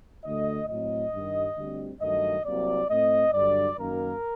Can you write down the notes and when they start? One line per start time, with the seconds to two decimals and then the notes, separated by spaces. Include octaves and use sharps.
0.24 D2 D3 A3 D#5
0.68 A2 F#3 C4 D#5
1.13 G2 D#3 G3
1.57 D2 D3 G3 C4
2.00 G2 D#3 F#3 A3 D#5
2.45 C2 C3 F#3 A#3 D5
2.89 A2 A3 C4 D#5
3.33 G2 D3 F#3 D5
3.78 F#2 D#3 F#3 A#3 A#4